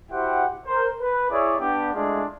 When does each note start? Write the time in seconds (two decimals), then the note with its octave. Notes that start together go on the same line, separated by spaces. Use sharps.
0.11 E4 F#4 G4 C5 F#5 G5
0.66 A#4 C5
1.00 B4
1.30 E4 G#4 C#5 D5
1.59 B3 D4 G4
1.94 G#3 A3 D4 E4 F4 G#4